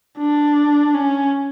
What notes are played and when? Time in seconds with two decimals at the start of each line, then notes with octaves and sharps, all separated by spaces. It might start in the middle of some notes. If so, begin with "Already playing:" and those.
0.18 D4
0.94 C#4